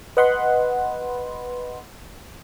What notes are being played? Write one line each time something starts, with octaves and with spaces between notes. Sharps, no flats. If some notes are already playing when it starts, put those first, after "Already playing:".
B4 D#5 F#5 B5 C6